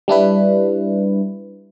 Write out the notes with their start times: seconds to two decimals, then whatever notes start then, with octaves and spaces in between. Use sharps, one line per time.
0.08 G3 D4 E4 B4